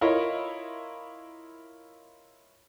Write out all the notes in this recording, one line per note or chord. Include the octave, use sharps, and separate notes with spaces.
E4 F4 A#4 C#5 D#5